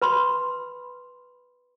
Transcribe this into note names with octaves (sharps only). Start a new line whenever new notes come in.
B4 B5 C6